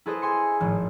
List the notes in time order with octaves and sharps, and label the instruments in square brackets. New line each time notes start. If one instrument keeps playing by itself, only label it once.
[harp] E4 G#4 A4 B4 C5 D#5
G#5 C6 C#7
G#1 A2 F3